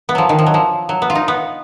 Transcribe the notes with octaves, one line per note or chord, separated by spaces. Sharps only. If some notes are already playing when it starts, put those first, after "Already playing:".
B3
F3 F#3
D#3
F3
F#3
F3
F#3
B3
F4
D#4
B3